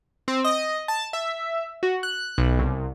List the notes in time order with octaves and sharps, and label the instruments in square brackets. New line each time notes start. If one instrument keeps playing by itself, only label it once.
[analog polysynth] C4
D#5
A5
E5
F#4
F#6
B1
C2